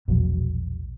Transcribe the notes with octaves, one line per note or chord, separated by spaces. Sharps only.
E1 A#1 F#3